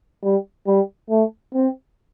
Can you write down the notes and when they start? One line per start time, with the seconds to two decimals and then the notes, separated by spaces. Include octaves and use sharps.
0.23 G3
0.67 G3
1.10 A3
1.54 C4